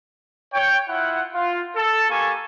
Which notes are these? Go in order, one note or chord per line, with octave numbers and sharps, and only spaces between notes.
C#5 G5
E4 F4 F#5
F4
A4
A#3 G4 A4 G#5 C#6